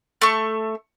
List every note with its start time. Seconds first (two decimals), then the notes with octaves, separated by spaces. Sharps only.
0.22 A3 C#6